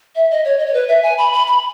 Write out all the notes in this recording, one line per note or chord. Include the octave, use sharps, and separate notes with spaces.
E5
D#5
C#5
D#5
C#5
B4
E5
G#5
B5
B5
B5